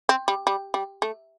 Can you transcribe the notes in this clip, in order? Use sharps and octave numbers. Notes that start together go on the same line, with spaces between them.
C4
G3
G3
G3
A3